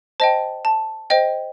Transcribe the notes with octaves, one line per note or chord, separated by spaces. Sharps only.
C5 D#5 G5 A5
A5
C5 D#5 G5